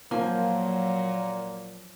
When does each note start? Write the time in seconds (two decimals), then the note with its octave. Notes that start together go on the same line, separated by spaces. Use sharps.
0.11 A#2 F3 F#3 A#3 G#5